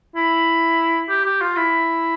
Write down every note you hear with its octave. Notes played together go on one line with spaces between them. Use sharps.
E4
G4
G4
F4
E4